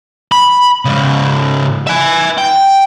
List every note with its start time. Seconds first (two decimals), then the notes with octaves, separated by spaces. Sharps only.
0.32 B5
0.85 G#2 C#3
1.87 E5 G#5
2.38 G5